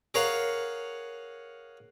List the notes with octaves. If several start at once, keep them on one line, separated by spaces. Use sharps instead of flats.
G#4 A#4 C#5 F5 F#5